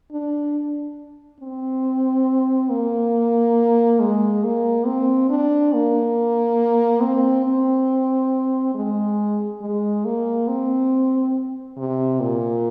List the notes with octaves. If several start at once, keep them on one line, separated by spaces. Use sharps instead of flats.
D4
C4
A#3
G#3
A#3
C4
D4
A#3
C4
C4
G#3
G#3
A#3
C4
C3
A#2